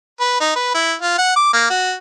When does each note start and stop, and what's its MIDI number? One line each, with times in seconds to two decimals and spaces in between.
0.20 0.38 71
0.40 0.53 63
0.55 0.74 71
0.74 0.94 64
1.02 1.15 65
1.18 1.34 78
1.36 1.51 86
1.53 1.66 58
1.70 1.94 66